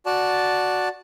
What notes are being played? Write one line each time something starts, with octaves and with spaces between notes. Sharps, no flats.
F#4 D5 A5